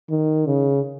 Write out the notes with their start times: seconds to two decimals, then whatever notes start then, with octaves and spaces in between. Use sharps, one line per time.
0.10 D#3
0.47 C#3